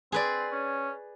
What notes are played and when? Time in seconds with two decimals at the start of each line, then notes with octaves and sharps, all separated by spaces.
0.12 C4 G#4 B4 D5
0.52 C#4